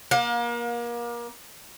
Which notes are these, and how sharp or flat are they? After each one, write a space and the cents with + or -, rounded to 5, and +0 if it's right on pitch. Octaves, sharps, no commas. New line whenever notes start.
A#3 +30 F5 +40